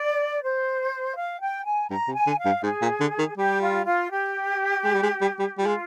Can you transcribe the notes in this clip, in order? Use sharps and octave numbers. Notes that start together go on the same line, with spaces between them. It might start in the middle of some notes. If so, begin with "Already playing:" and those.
Already playing: D5
C5
F5
G5
G#5
G2 A#5
C3
G#5
D3
F5
G2
G#2 G#4
A#2
D3
D#3
G3 G4
F4
F4
G4
G#3
G3
G#3
G3
G3
G3 F4
G#3